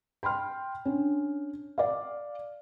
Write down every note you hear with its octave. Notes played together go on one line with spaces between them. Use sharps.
G5 B5 C6 F6
C#4 D4
D5 F5